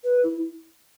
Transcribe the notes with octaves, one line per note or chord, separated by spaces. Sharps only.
B4
E4